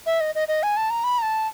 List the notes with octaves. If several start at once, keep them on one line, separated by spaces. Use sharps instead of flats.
E5
D#5
D#5
D#5
G#5
A5
A#5
B5
A#5
A5